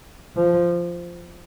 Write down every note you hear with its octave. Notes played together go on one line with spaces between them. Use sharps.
F3